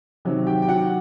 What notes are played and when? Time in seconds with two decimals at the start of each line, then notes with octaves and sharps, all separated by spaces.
0.25 C3 D#3 F#3
0.47 G4 G5
0.62 G5
0.69 F#4 F#5